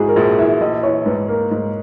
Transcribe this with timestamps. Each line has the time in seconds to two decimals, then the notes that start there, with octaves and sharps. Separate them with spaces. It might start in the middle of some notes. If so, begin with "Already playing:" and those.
Already playing: G#2 E4 F#4 G#4
0.09 A#4
0.16 A#1 G#4
0.38 E3 E5
0.61 A#1 D#5
0.83 E3 C#5
1.06 G#2 B4
1.29 A#3 A#4
1.51 G#2